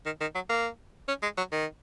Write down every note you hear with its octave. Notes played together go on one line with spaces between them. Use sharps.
D#3
D#3
F#3
A#3
C#4
G#3
F#3
D#3